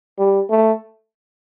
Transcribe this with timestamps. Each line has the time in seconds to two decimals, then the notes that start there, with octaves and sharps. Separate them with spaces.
0.19 G3
0.50 A3